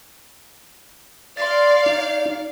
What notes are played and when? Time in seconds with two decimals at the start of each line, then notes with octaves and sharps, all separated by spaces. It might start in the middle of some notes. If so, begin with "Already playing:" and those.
1.37 D5 F5 C6 A6
1.86 D#4